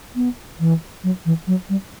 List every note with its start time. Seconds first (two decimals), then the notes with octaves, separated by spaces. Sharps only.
0.15 B3
0.60 E3
1.04 F#3
1.25 E3
1.47 F#3
1.69 G3